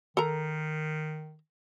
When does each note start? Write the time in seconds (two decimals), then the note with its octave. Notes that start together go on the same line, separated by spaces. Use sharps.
0.17 D#3 A4 A#4 A#5